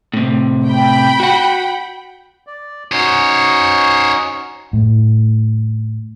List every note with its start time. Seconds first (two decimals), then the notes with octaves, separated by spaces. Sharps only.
0.13 A2 C3
0.66 G5 B5
1.20 F#4 F#5
2.47 D5
2.92 C#4 D#4 F#4 C5 C#5
4.73 A2